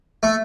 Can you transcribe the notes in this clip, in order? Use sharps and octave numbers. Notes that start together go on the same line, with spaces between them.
A3